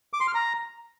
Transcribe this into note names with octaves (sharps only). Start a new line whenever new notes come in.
D6
C6
F6
A#5